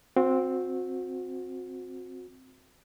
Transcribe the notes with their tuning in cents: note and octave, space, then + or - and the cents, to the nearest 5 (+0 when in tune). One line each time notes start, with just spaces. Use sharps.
C4 +0 F#4 -30